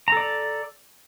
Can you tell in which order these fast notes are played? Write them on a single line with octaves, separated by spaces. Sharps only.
A#5 A4 D5